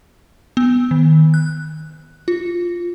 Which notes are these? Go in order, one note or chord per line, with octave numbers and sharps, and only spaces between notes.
B3
D#3
F#6
F4